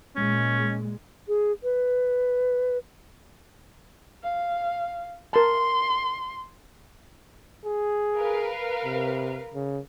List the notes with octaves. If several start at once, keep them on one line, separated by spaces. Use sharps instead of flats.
A#2 G#3 C#4
G#4
B4
F5
A#4 A5 C6
G#4
A#4 B4 F5
C3
C#3